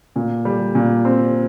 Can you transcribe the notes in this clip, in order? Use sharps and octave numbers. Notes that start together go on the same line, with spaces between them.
A#2
G3
A#2
C4